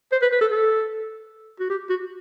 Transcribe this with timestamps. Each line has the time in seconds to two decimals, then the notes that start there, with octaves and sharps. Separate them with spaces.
0.12 C5
0.22 B4
0.32 B4
0.41 A4
0.51 A4
1.60 F#4
1.70 G4
1.89 F#4